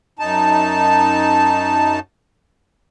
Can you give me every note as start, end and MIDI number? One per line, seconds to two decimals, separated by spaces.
0.19 1.99 42
0.19 1.99 63
0.19 1.99 81